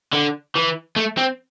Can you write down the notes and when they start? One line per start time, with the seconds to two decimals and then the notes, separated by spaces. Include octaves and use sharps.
0.13 D3
0.55 E3
0.96 A3
1.17 C4